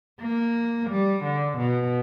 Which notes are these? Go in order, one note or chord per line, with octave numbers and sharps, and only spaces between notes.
A#3
G3
D3
B2